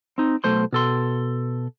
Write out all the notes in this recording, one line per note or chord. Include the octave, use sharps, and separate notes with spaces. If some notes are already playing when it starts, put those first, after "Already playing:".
C4 D#4
B1 A3 C5 C6
B2 A4 C6